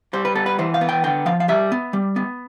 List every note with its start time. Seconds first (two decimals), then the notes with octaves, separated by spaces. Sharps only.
0.13 G3 C5
0.25 B4
0.35 B3 A4
0.46 B4
0.59 E3 C5
0.74 F5
0.81 B3
0.89 G5
1.04 D3 G5
1.26 F3 F5
1.40 F5
1.48 G3 E5
1.72 B3
1.93 G3
2.16 B3